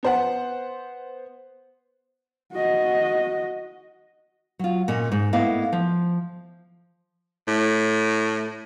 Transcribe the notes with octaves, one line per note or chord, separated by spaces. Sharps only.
B3 C5 F#5
F#4 D#5
F#3 F4
A#2 C#4 D#5
G#2
A2 A#3 B3 E4 D#5 F5
F3
A2